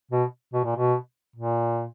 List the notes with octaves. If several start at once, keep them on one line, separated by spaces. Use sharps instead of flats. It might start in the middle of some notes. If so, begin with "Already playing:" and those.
B2
B2
A#2
B2
A#2